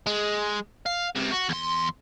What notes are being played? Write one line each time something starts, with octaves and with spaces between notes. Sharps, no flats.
G#3
F5
C#2 C3
F#4
E2 C6